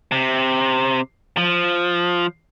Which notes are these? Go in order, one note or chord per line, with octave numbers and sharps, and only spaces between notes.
C3
F3